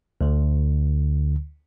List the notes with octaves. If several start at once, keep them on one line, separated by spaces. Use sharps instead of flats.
D2 D3